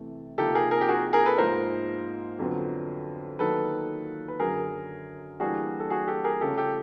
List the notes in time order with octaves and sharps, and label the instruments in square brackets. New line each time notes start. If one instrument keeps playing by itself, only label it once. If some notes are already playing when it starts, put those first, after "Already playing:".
Already playing: [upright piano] C3 E3 A3
[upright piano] C3 F3 A#3 D#4 [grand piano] G4 A4
[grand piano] G#4 A#4
G#4 A#4
G4
F#4 G#4
G#4 A#4
A4 B4
[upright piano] G#2 F3 A#3 D#4 [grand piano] A#4 C5
[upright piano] F2 D3 F#3 B3
[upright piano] D#3 F#3 A#3 D#4 [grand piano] A4 B4
[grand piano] B4
[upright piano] F#2 D3 F#3 [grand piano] G#4 A#4
[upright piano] E3 G3 A#3 D4 [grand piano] F#4 G#4
[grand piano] A4
F#4 G#4
G4 A4
G#4 A#4
[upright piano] C#3 F3 A3 C#4 [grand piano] G4 A4
[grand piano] G4 A4